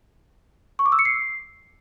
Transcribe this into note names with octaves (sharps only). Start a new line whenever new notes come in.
C#6
D6
E6
C#7
C7